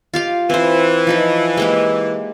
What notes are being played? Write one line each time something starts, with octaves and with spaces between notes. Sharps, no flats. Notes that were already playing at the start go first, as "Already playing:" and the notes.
F4 G4 F5
E3 C4 C5
F3 D#4 B4
G#3 A#3 G4